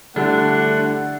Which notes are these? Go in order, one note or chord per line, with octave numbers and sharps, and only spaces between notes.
D3 G3 A3 D4 E4 F#5